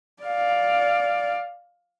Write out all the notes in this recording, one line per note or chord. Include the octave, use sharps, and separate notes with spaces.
D5 F5